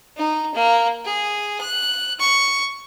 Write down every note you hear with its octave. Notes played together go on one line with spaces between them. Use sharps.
D#4
A#3
G#4
F#6
C#6